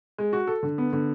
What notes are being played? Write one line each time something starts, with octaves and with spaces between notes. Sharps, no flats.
G#3
F#4
A4
D3
B3
D3